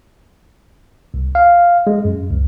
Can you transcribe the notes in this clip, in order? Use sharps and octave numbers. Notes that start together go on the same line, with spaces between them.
C2
F5
G#3
F#2
C#2